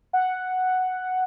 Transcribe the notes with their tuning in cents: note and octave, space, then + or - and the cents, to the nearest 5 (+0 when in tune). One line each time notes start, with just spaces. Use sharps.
F#5 +0